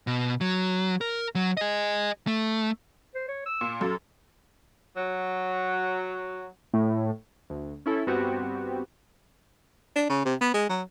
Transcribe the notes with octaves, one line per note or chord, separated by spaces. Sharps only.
B2
F#3
A#4
F#3
G#4 D#5
A3
C5
C#5
E6
A#2
F#2 A4
F#3
A2
D2
C#4 E4 A4
G2 B3 C4 F#4 G4
D4
C#3
C3
B3
G#3
F#3